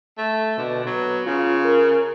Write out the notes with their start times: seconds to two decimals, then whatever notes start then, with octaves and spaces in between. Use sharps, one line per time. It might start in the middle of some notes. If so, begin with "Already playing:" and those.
0.18 A3
0.58 B2 D3
0.87 F#3 B3
1.27 C#3 F4
1.65 A#4